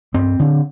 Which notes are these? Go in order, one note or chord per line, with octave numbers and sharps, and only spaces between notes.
G2 C4
D3